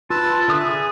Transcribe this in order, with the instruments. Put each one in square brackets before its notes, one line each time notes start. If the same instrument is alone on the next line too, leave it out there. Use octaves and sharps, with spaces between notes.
[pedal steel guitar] F4 [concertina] B4 A5 E6
[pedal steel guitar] D3 D#6 F#6 [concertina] E5
[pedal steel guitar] G#4